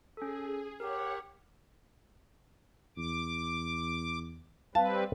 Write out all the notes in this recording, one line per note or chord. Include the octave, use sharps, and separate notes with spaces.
C#4 G#4 A4
G4 A#4 C#5 F#5
E2 D6
G3 C4 B4 F5 A5